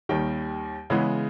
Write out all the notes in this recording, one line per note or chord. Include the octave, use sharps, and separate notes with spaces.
D#2 D#3 G3 G5
C#3 E3 G#3 B3